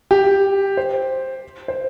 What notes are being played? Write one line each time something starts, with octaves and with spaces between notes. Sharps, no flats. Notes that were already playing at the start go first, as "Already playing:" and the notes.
G4
C5
C5